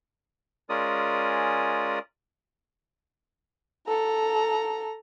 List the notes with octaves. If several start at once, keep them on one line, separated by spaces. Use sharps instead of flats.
G#3 C#4 F4 A#4 D5 D#6
A4 A#5